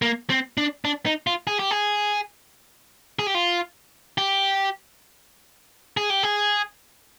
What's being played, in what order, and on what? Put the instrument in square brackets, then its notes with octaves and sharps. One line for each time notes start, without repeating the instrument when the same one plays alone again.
[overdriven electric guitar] A#3
C4
D4
D4
D#4
F4
G#4
G4
G#4
G#4
G4
F4
G4
G#4
G4
G#4